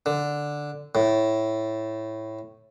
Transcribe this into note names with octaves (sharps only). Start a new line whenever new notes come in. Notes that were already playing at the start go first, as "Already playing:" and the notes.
D3
A2